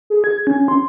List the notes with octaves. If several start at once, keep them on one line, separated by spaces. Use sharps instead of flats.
G#4
G#6
C#4
C6